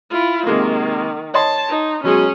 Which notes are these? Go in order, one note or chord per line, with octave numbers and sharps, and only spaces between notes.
E4 F4
C3 D#3 G#3 A#3
C#5 D#5 A5 C6
D#4
B2 F#3 G#3 C#4 G#4